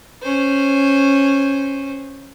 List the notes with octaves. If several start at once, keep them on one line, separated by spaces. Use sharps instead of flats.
C#4 C5